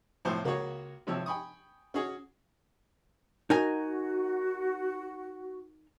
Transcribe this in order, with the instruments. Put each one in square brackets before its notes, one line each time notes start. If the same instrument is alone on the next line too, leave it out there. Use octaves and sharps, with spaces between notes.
[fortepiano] B1 A2 C3 F3 C5 D#6
C#2 A#3 F#4 G#4 C#5 C#6
G#1 C3 F3 C#5 E6
G5 G#5 B5 C#6 D#6
C#4 F#4 G#4 C#5
[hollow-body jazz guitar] D#4 A#4 G#5 [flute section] F#4